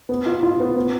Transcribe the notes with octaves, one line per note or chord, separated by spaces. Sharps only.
B3
F4
F4
B3
B3